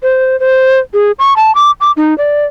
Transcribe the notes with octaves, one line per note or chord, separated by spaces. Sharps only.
C5
C5
G#4
C#6
A5
D6
D6
D#4
D5